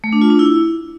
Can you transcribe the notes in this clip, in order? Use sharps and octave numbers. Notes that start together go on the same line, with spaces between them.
A3
D4
F4
D4
E4